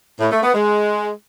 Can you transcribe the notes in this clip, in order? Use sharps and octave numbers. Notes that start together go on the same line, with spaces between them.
A2
A3
B3
G#3